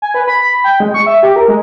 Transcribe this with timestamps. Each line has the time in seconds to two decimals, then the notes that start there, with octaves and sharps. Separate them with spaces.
0.02 G#5
0.14 B4
0.27 B5
0.41 B5
0.64 G5
0.80 G#3
0.94 C#6
1.06 E5
1.23 G4
1.36 A#4
1.48 G#3